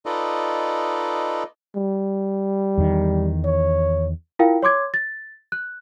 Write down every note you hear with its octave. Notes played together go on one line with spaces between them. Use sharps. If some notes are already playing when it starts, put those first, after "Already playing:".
D#4 F4 A4 B4 D5 D#5
G3
E2 D#3
C#5
E4 F4 A#4 F5 G5
C#5 C6 D6 G#6
A6
F#6